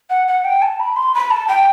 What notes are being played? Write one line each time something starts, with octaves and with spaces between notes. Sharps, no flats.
F#5
F#5
G5
A5
B5
C6
B5
A5
G5